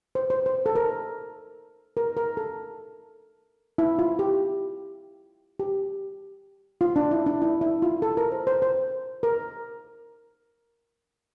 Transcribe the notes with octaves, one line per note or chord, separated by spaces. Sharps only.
C5
C5
C5
A4
A#4
A#4
A#4
A4
E4
F4
G4
G4
F4
D4
E4
D4
E4
E4
F4
A4
A#4
C5
C5
C5
A#4